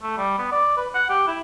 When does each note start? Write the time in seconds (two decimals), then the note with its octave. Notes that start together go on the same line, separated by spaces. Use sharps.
0.02 A3
0.17 G3
0.38 B3
0.52 D5
0.77 B4
0.95 F#5
1.10 G4
1.27 E4